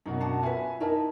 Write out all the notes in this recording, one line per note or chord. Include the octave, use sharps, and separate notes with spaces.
F#2 B2 D#4 F#4
D4 F#5 A5
F4 B4 E5 G#5
D#4 E4 A#4 D#5 A5